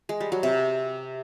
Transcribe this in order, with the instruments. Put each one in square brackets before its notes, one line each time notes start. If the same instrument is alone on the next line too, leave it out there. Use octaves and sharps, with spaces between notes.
[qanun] G#3
G3
F#3
C3